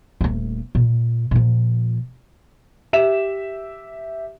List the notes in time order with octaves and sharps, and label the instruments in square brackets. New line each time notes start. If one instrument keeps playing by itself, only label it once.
[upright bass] D#1 A3
A#2
A#2 F3
[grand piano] G4 E5 E7